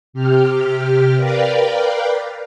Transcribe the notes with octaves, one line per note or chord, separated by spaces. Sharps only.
C3 G4 F6
A#4 B4 D5 F5 G5